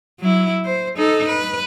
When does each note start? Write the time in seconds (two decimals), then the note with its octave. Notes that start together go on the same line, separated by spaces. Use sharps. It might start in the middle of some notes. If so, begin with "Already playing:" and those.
0.20 F#3 E4
0.65 C5
0.97 D#4 A4
1.28 B4